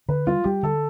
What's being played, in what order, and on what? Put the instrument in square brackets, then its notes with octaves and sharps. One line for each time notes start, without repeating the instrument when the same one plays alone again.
[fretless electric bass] D3 [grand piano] B4
[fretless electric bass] G3 [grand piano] F4
[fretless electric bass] G3 [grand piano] G4
[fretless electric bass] D3 [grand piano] A4